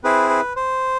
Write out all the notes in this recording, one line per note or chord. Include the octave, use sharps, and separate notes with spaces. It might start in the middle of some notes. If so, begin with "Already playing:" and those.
C4 E4 G#4 B4
B4
C5